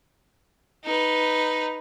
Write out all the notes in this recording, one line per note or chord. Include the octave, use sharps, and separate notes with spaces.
D#4 B4